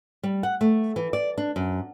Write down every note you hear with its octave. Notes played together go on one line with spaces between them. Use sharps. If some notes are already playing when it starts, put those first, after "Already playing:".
G3
F#5
A3
E3
D5
D4
F#2